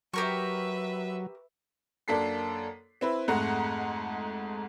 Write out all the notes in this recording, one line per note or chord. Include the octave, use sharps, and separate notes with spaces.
F#3 G4 A#4 B4 E5 C#6
F#2 A#3 D4 A4 B6 C7
C4 E4 B4
F2 G#2 G#3 A3 F#5 A#5